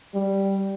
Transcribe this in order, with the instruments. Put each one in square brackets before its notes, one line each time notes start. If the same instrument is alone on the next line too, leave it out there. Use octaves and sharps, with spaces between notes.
[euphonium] G3